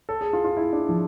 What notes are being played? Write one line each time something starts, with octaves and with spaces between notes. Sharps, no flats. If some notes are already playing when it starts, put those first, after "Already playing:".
A4
G#4
F4
F4
E4
D4
F3